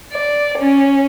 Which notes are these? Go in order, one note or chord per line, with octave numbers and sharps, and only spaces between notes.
D5
C#4